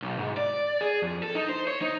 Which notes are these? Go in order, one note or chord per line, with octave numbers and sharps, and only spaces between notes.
B1
G#2
D5
G#4
F2
A4
D#4
C5
C#5
D#4